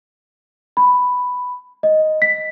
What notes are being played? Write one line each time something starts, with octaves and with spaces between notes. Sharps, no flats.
B5
D#5
B6